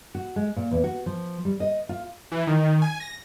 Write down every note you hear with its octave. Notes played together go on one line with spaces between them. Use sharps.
F#4
G#3
A#2
E2
F#4
F3
G3
D#5
F4
E3
D#3
G#5
A#6